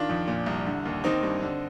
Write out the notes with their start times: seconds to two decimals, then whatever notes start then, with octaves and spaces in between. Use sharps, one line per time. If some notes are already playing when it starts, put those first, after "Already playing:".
Already playing: D#3 D4 F4
0.09 F2
0.27 A#2
0.46 C2
0.66 D3
0.85 D#2
1.04 D#3 C4 D#4
1.23 G2
1.42 D3